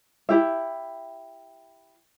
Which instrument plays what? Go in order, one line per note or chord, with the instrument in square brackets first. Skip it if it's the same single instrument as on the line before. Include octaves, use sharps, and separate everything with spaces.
[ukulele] E4 G4 E5